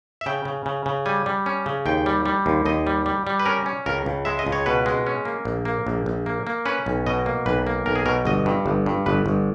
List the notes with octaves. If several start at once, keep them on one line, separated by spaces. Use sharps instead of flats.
E5
C#3 G5
C#3
C#3
C#3
G3 G#5
G3
C#4
C#3
D#2 G5
G3
G3
D#2
D#2 D#5
G3
G3
G3
B4
C#4 A#4
C#4
C#2 A#4
C#2
G#3 E5
D#5
C#2
C#5
B2 B4
G#3
C#4
A#3
A#1
A#3
A#1
A#1
A#3
A#3
C#4 B4
B1
B2 D#5
A#3
B1 B4
A#3
B1 A#4
G#4
B2 A#4
G1 D#5
G2
G1
G2
G1 B4
G1